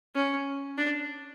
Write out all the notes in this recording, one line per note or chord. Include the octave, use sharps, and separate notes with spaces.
C#4
D4